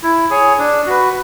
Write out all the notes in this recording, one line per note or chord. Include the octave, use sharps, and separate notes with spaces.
E4
G#4 C#5 G#5
D4
F#4 B4